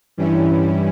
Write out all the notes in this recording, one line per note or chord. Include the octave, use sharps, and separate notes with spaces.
G2 E3 G3 C#4 E4